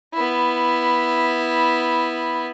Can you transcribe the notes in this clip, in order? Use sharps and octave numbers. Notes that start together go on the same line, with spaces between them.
B3 E4